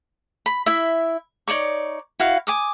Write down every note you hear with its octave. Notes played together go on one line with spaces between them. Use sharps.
B5
E4 E5
D#4 C#5 D5 C#6
E4 F#4 F5
G#5 D6 D#6